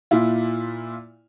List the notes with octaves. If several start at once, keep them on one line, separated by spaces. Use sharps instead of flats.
A#2 E4 F4